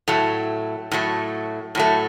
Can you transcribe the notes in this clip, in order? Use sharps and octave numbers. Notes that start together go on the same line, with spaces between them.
A2 F#3 A3
A2 F#3 A3
A2 F#3 A3